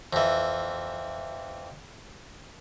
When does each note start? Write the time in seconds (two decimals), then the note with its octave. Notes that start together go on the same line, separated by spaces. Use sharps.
0.13 F2 E3